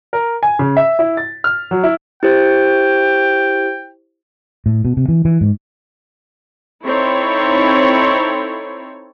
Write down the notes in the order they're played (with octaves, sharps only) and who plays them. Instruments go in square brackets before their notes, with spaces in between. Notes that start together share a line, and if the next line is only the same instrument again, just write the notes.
[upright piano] A#4
G#5
C#3
E5
E4
A6
F6
F#3
E4
[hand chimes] E4 G4 C5 [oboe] G5
[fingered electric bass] A2
B2
C3
E3
E3
G#2
[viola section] C4 D#4 E4 A4 C#5